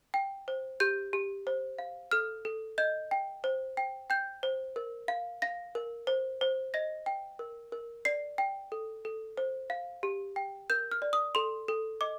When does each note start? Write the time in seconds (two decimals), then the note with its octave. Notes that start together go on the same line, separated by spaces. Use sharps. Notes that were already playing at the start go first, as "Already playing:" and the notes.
0.14 G5
0.48 C5
0.80 G4 G6
1.13 G4
1.47 C5
1.79 F5
2.11 A4 F6
2.45 A4
2.78 D#5 G6
3.11 G5
3.44 C5
3.77 G5
4.10 G5 G6
4.43 C5
4.76 A#4
5.08 F5
5.42 F5 A#6
5.75 A#4
6.07 C5
6.41 C5
6.74 D#5 A#6
7.06 G5
7.39 A#4
7.72 A#4
8.05 D5 C7
8.38 G5
8.72 A4
9.05 A4
9.38 C5
9.70 F5
10.03 G4
10.36 G5
10.70 A#4 G6
10.91 F6
11.02 D5
11.13 D#6
11.35 A4 C6
11.68 A4
12.01 D#5 D6